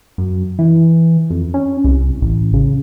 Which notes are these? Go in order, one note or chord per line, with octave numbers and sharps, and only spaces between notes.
F#2
E3
F2
C#4
C2
A1
C#3